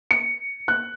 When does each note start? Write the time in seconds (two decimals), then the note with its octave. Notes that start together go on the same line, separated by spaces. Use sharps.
0.11 C#7
0.68 F#6